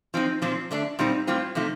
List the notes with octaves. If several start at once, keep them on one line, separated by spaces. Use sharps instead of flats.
F3 C4 D#4
A#2 F3 C4 F4
D3 A3 D4
A#2 G3 C4 D#4
A2 G3 C4 F4
C3 F3 A3 D#4